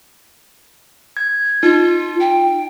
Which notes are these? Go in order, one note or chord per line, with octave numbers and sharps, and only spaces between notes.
G#6
D#4 F4
G5